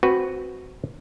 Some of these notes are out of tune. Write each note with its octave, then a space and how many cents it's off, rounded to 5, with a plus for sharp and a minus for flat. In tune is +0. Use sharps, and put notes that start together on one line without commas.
C4 +0 F#4 +0 B4 +0